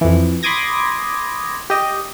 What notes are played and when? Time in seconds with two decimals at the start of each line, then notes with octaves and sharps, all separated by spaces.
0.01 F2 E3
0.43 B5 C6 D6 D#6 G#6 A#6
1.70 G4 D#5